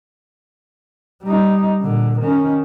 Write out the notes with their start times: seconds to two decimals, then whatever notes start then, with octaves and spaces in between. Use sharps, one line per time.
1.24 G3 D#4
1.81 A#2 D3
2.21 D#3 C#4